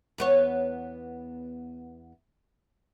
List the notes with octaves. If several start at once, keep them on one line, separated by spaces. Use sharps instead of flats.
E2 B3 C#5